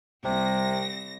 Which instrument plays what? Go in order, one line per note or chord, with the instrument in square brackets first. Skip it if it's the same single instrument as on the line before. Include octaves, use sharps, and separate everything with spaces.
[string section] C2 A#6 [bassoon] C3